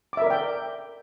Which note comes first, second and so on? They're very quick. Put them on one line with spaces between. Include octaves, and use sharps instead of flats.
D6 E5 A#4 D5 G5